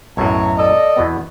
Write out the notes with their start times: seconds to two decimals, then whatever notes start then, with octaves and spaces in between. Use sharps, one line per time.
0.17 B1 F#2 A2 C#5 E5 A#5
0.57 A4 D5 D#5
0.96 E2 B2 B3